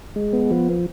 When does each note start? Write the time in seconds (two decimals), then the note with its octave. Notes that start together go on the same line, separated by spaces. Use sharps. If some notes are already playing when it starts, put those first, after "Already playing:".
0.16 G#3
0.33 B3
0.51 F3